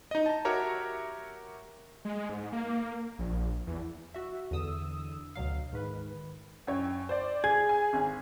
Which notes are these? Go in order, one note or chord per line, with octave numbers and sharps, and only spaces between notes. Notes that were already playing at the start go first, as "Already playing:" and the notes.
D#4 D#5
A5 A#5
F#4 G4 A#4 C#5 E5 A#5
G#3
G#2
A#3
A#1
E2
F#4 E5
E2 D3 D#6 E6
D2 B2 F#3 F5
G#2 D#3 B4
F#2 C#5 G5
C5 D5
G#4 G#6
G#5
G#1